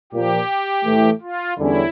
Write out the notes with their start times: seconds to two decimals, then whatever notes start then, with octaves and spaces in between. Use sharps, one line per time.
0.12 A#2 F3 A#3 G4
0.85 A2 E3 A3
1.21 F4
1.58 E2 D3 G3 C#4 E4